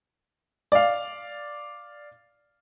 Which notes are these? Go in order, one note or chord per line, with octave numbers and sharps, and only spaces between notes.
D5 F5